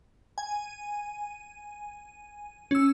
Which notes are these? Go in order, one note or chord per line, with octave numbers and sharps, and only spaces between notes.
G#5
C#4 E6